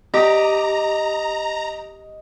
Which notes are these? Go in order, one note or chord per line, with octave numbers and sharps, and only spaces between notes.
G4 D#5 A#5